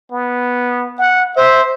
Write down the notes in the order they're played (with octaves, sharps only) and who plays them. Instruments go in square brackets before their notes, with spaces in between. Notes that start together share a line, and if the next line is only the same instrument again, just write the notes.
[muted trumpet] B3
F#5
[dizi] C5 [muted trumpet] E5